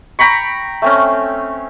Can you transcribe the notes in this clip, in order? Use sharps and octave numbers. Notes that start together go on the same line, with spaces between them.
G5 A#5 B5 C#6
A3 C4 C#4